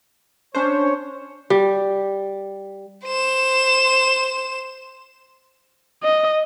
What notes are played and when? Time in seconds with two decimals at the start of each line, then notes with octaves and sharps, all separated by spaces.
0.55 C#4 D4 C5 C#5
1.50 G3
3.06 C5 E7
6.03 D#5